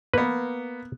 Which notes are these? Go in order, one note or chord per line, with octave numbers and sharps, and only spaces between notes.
A#3 B3 B4